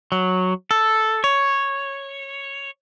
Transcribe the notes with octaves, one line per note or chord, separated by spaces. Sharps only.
F#3
A4
C#5